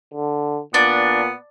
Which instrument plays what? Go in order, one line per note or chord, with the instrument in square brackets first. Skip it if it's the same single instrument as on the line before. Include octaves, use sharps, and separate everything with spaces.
[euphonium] D3
[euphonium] A#2 [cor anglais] B3 [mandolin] D4